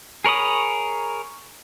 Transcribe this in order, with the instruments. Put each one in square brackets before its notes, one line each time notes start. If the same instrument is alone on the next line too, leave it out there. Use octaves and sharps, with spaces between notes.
[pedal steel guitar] G#4 A#4 C#5 B5 D#6